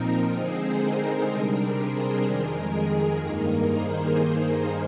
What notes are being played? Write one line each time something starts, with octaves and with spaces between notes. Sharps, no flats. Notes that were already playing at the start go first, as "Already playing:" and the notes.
Already playing: A#2 F3 C4 D#4 A#4
D3 G#3 C4 D#4 G#4 C5
A#4
C3 G3 D4 A#4
G#4 C5
F2 D#3 G#3 A#4
G#4
G2 D#3 A#3 D#4 A#4
G#4 C5